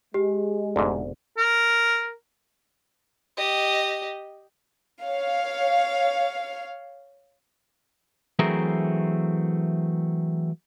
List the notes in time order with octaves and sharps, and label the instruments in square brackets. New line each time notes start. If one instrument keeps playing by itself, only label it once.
[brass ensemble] G#3 [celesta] G4
[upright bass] F1 B2 [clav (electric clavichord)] D2 G#2
[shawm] A#4
[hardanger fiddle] G4 D#5
[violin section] C#5 F5
[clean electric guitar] E3 F#3 A3 C4 G#4 A#4